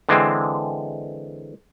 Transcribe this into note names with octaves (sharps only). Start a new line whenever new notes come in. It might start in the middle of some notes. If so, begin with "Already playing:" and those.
D3 E3 G#3 C4